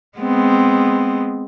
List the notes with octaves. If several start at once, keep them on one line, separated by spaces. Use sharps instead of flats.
G#3 B3 C4